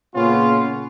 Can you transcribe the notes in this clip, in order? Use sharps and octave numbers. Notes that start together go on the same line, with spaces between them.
A#2 C#3 B3 C#4 F4